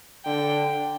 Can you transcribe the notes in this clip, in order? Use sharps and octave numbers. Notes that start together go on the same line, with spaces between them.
D3 G5